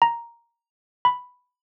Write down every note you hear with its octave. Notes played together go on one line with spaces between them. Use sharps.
A#5
B5